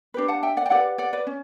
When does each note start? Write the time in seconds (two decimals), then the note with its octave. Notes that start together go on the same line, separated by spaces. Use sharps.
0.14 D4 G4 B4
0.28 F#5 A5
0.43 E5 G5
0.57 D5 F#5
0.66 G5
0.70 E4 G4 B4 D5 F#5
0.98 D5 F#5
1.13 B4 D5
1.27 C#4